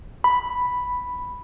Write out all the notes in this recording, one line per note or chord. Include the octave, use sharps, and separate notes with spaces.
B5